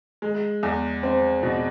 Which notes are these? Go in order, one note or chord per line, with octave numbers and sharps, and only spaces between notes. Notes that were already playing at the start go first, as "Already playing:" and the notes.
G#3
E2
C4
B2